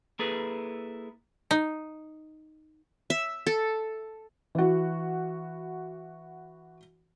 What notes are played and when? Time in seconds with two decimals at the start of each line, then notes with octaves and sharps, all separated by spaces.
0.19 A#3 E4 G#4 A4 B4
1.51 D#4
3.10 E5
3.47 A4
4.55 E3 F#4